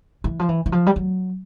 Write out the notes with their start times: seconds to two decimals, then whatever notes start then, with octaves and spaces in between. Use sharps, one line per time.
0.24 E3
0.39 F3
0.49 E3
0.66 E3
0.72 F3
0.87 G3
0.96 F#3